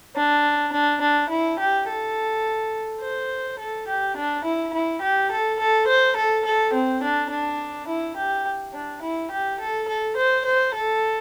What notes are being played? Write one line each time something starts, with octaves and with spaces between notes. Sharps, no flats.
D4
D4
D4
E4
G4
A4
C5
A4
G4
D4
E4
E4
G4
A4
A4
C5
A4
A4
C4
D4
D4
E4
G4
D4
E4
G4
A4
A4
C5
C5
A4